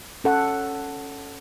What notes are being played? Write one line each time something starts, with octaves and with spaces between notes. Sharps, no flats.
C#4 A4 F#5